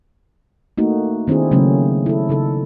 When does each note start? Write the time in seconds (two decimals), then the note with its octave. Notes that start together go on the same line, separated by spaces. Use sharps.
0.78 A3 A#3 D#4 F#4
1.28 D#3 C4 D4 E4 G#4
1.51 C#3 F#3 A3 A#3 C#4
2.06 E4 A4
2.29 C#3 D#4 A4